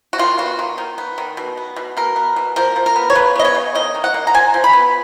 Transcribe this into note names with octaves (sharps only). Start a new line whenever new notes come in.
F#4
D#3 F4
B3 F#4
D#3
D#3
B3
D#3
B2
B3
B2
B2 A#4
B3
B2
F3 A#4
F3
A#4
B3
C#5
C#3 B4
B3 D#5
C#5
C#3
D#3 D#5
D#3
F#5
A#3
A#5
F3 G#5
F3
B5
B3